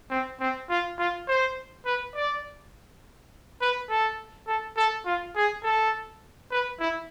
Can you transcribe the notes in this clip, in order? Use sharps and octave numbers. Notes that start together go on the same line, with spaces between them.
C4
C4
F4
F4
C5
B4
D5
B4
A4
A4
A4
F4
G#4
A4
B4
E4